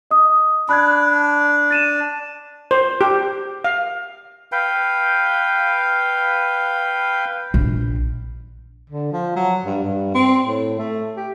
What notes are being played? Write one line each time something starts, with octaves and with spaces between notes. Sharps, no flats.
D#5 D#6
D4 B5 F#6 G#6
A6 D#7 E7
C5
G4
F5
B4 F5 G5
A#1
D3
F3
F#3
G2
G2
C4
A2
A3
G4